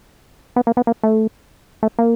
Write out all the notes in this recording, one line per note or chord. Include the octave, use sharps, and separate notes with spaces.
B3
A#3
B3
A#3
A3
A3
A#3